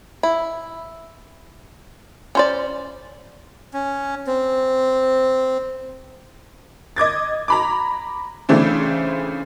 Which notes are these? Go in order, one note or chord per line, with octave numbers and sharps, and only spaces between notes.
E4
C#4 C5 D5
C#4
C4
D#5 D6 G#6 A6
A#5 B5 D6
C#3 E3 A3 C4 D4